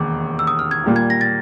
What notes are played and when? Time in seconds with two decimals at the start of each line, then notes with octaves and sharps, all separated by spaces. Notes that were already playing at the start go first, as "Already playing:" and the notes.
Already playing: E1 D#2 D6
0.39 E6
0.47 D#6
0.59 F6
0.71 G#6
0.84 A#2 G3 A#3
0.96 G#6
1.10 A#6
1.21 A6